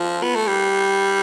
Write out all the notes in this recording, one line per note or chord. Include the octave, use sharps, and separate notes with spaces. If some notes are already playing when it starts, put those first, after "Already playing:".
Already playing: F3
B3
A3
G3